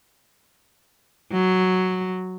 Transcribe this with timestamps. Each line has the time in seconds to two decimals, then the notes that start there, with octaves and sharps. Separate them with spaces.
1.32 F#3